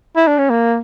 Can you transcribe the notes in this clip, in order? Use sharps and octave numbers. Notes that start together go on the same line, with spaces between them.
E4
D4
C#4
A#3